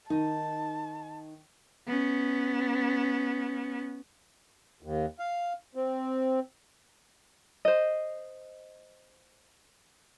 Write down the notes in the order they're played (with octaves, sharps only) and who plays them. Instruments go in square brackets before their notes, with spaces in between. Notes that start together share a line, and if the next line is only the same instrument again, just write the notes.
[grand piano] D#3 [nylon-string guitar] D#4 [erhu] A5
[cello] B3 C#4
[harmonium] D#2
F5
C4
[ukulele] C5 D#5